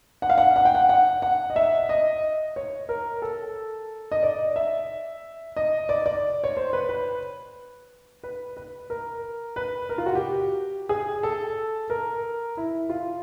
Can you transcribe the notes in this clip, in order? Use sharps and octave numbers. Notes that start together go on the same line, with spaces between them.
F#5
F5
F#5
F#5
G5
F#5
F#5
F#5
D#5
E5
D#5
C#5
A#4
A4
D#5
D5
E5
D#5
D5
D5
C#5
C5
B4
B4
B4
B4
A#4
B4
A#4
F4
F#4
G4
G#4
A4
A#4
E4
F4